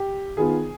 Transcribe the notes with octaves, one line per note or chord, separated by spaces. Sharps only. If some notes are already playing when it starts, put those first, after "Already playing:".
Already playing: G4
D#3 B3 F4 G#4